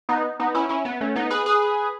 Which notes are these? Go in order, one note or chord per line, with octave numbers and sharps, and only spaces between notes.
B3 D#4
B3 D#4
C#4 E4
C#4 E4
B3
A3 C#4
B3 D#4
G#4 B4
G#4 B4